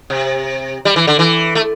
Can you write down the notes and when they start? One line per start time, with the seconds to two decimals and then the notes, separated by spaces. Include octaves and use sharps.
0.10 C3
0.85 G3
0.96 E3
1.07 D3
1.19 E3
1.55 A3